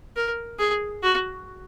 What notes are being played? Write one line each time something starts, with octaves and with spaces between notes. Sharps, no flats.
A#4
G#4
F#4